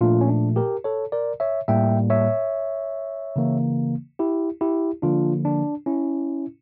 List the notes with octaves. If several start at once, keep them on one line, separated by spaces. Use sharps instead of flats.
A#2 F3 A3 D4 F4
C#4
D4
G4 A#4
A4 C#5
A#4 D5
C#5 E5
A2 G3 A#3 E5 G5
C#5 E5
C#3 E3 A#3
E4 G4
E4 G4
D3 F3 A#3 D4 F4
D4
C#4 E4